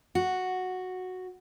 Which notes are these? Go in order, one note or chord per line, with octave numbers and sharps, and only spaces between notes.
F#4